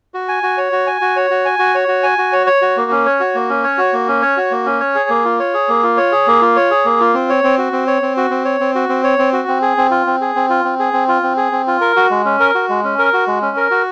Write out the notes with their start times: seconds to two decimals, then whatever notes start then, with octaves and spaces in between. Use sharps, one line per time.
0.14 F#4
0.28 G#5
0.43 F#4
0.58 C#5
0.72 F#4
0.87 G#5
1.01 F#4
1.16 C#5
1.30 F#4
1.45 G#5
1.59 F#4
1.75 C#5
1.88 F#4
2.03 G#5
2.18 F#4
2.33 C#5
2.47 C#5
2.62 F#4
2.77 A#3
2.91 C#4
3.06 C#5
3.20 F#4
3.35 A#3
3.50 C#4
3.64 C#5
3.78 F#4
3.93 A#3
4.08 C#4
4.22 C#5
4.37 F#4
4.51 A#3
4.66 C#4
4.80 C#5
4.95 G#4
5.10 A#3
5.25 F4
5.39 C#5
5.54 G#4
5.69 A#3
5.83 F4
5.97 C#5
6.12 G#4
6.27 A#3
6.41 F4
6.56 C#5
6.71 G#4
6.85 A#3
7.00 F4
7.14 C4
7.29 C#5
7.44 C4
7.58 F#4
7.73 C4
7.87 C#5
8.02 C4
8.17 F#4
8.30 C4
8.45 C#5
8.60 C4
8.75 F#4
8.89 C4
9.04 C#5
9.19 C4
9.33 F#4
9.48 C4
9.62 G#4
9.77 C4
9.91 F4
10.06 C4
10.21 G#4
10.36 C4
10.50 F4
10.65 C4
10.79 G#4
10.93 C4
11.08 F4
11.23 C4
11.37 G#4
11.52 C4
11.67 F4
11.81 A#4
11.96 F#4
12.11 G#3
12.25 C#4
12.40 A#4
12.55 F#4
12.69 G#3
12.84 C#4
12.99 A#4
13.13 F#4
13.27 G#3
13.42 C#4
13.57 A#4
13.71 F#4